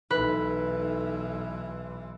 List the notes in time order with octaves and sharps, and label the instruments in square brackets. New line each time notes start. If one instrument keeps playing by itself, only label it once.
[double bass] B1 E3 [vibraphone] D#4 A4 [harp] B4